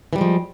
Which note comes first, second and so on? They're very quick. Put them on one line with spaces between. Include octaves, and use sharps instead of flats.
E3 G3 G#3 F3